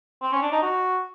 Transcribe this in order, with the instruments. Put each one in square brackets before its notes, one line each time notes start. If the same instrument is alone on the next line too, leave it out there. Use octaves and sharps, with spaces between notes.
[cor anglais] C4
C#4
D4
D#4
F#4